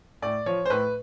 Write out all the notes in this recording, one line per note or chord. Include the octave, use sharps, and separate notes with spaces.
A2 D5
F3 C#5
C5
A2 B4